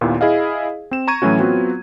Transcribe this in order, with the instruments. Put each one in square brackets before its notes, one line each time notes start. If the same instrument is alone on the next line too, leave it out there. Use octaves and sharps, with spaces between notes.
[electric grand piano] D#2 A#2 B3 E4
E4 G#4 D#5 F5
C4 E7
A#5 C#6 G#6 D#7
A2 E3 F#3 A3 C#4 F#4
F#3 B3 C4 F4 F#4